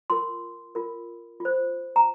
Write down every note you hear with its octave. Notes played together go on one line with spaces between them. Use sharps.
F4 A#4 C6
F4 A#4
F4 C5
A#5